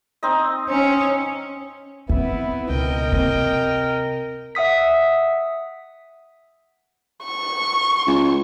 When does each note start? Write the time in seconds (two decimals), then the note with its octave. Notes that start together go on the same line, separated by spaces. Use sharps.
0.23 C4 D#4 D#5
0.69 C#4
2.09 B3 C4 E4 E5
2.69 C#2 B2 A#4 D#5 G5
3.12 C3 C4
4.55 E5 F#5 D#6 B6
7.24 C#6
8.07 C#2